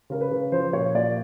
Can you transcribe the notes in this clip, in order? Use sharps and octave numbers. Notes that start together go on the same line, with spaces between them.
C#3 A#4
B4
C#3
F3 C5
A#2 C#5
A#2 D5